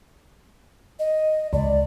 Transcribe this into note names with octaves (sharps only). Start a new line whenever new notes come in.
D#5
C#2 D5